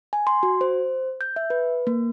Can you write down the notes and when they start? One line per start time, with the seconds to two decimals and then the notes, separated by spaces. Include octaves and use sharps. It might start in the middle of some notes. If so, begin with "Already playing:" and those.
0.13 G#5
0.27 C6
0.43 F#4
0.61 C5
1.21 G6
1.36 E5
1.50 B4
1.87 A#3